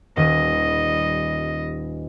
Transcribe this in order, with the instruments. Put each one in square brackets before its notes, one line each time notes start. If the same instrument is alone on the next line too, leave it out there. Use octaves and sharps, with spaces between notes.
[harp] D#1 D#7 [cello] G3 D#5